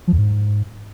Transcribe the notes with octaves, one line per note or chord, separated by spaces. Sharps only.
F3
E2
G#2